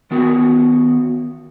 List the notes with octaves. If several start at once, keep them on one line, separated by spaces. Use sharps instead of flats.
D#3 B3 F#4